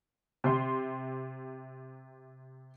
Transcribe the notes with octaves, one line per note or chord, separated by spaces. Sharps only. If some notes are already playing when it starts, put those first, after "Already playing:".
C3 C6